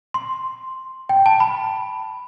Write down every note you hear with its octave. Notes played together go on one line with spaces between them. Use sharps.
C6
G5
A5
B5